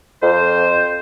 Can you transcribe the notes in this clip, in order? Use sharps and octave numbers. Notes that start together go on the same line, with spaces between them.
F2 C5